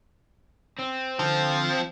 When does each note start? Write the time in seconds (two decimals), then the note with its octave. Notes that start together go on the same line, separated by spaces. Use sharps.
0.79 C4
1.19 D3 F3